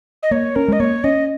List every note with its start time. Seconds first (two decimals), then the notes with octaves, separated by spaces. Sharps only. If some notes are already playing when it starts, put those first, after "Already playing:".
0.23 D#5
0.31 A#3 C#5
0.56 C#4 A#4
0.68 G#3 D#5
0.80 A#3 C#5
1.04 C#4 D#5